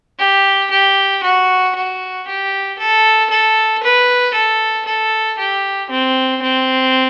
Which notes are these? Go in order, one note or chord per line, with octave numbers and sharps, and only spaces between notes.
G4
G4
F#4
F#4
G4
A4
A4
B4
A4
A4
G4
C4
C4